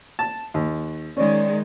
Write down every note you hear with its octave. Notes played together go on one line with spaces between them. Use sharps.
A5
D#2
D#3 G#3 C#4 D5